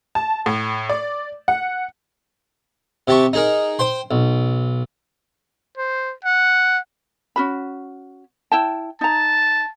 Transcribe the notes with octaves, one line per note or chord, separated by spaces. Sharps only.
A5
A2
D5
F#5
C3 G4 A5 C#6
D#4 G#4 A#4
C5 G5 C6
B1
C5
F#5
C#4 F#4 B5
E4 G5 A5
D#4 A5 A#5